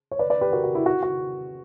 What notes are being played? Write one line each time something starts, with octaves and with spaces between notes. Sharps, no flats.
C#5
B4 D5
B4 D5
G4 B4
F#4 A#4
F#4
E4
F#4
F#4